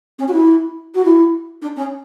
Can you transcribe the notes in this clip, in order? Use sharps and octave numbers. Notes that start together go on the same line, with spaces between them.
C#4
F#4
E4
F#4
E4
D4
C#4